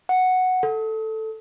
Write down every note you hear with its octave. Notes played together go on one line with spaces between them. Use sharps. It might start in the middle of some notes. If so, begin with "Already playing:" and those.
F#5
A4